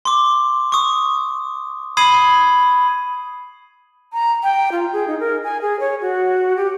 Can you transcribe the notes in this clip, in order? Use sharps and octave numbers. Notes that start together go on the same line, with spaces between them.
C6 D6
C#6 D#6
B5 D#6 G#6 C7 D#7 F#7
A#5
G5
F4
G#4
D#4
A#4
G#5
G#4
C#5
F#4
G4